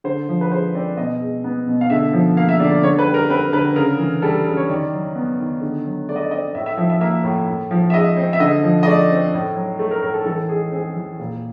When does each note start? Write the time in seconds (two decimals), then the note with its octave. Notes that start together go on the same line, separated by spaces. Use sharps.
0.04 D3 C5
0.29 F3
0.41 B4
0.52 G#3 C5
0.74 C4 D5
0.97 B2 D#5
1.20 G#3
1.44 B3
1.67 B2
1.81 F5
1.90 D3 E5
2.13 F3
2.37 A#3 F5
2.49 E5
2.60 D3 D5
2.71 D5
2.83 D3 C#5
2.99 B4
3.06 G3
3.14 A#4
3.30 C4 B4
3.53 D3 B4
3.76 C#3 A#4
3.99 E3
4.22 G3 A4
4.46 C#3
4.57 C#5
4.69 D#3 D5
4.93 F#3
5.15 B3
5.39 D#3
5.61 D3
5.85 F#3
6.08 A3 D5
6.16 D#5
6.23 D5
6.31 C4 D#5
6.55 A2 E5
6.66 E5
6.77 F3 E5
6.90 E5
7.01 A#3 E5
7.24 A2
7.48 A2
7.71 F3
7.90 E5
7.94 G#3 D#5
8.17 C4
8.33 E5
8.40 D3 D#5
8.63 F3
8.83 D#5
8.86 A3 D5
9.11 C4
9.34 A2
9.56 F#3
9.79 A3
9.91 A#4
10.02 A2 A#4
10.14 A4
10.25 E3 A4
10.49 G#3 G#4
10.72 C4 G#4
10.96 E3
11.19 A#2